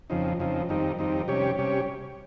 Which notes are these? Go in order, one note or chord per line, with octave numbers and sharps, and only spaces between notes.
F2 C#3 F3 C4 D#4
F2 C#3 F3 C4 D#4
F2 D#3 G3 C4 D#4
F2 D#3 G3 C4 D#4
C3 G3 C#4 G4 C#5
C3 G3 C#4 G4 C#5